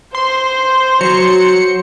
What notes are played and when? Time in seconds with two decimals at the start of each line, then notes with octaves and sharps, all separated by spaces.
0.15 C5 C6
1.01 F#3 C#7